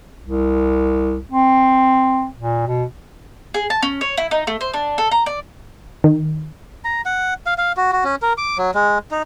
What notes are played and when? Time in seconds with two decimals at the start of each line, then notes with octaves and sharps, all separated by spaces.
0.24 C2
1.32 C4
2.38 A#2
2.67 B2
3.54 G#4
3.70 A5
3.82 C#4
4.01 C#5
4.17 E4
4.31 D#4
4.47 A3
4.61 C5
4.74 D4
4.98 A4
5.11 A#5
5.26 D5
6.04 D#3
6.85 A#5
7.06 F#5
7.46 F5
7.58 F5
7.77 F#4
7.92 F#4
8.04 C#4
8.22 A#4
8.38 D6
8.58 F#3
8.75 G#3
9.11 D#4